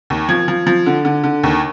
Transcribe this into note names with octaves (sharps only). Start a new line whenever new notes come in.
D#2
F3 G#6
F3
F3
D3
D3
D3
D#2